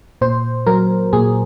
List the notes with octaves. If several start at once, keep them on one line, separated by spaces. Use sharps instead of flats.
A#2 C5
F#3 A#4
A#2 G#4